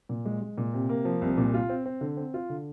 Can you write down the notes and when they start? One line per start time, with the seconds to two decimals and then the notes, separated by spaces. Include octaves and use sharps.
0.09 A#2
0.25 G#3
0.42 G#3
0.58 A#2
0.74 C3
0.89 A#3
1.05 F3
1.22 C2
1.38 A#2
1.54 F4
1.69 C4
1.86 C4
2.01 D3
2.17 C4
2.34 F4
2.49 D3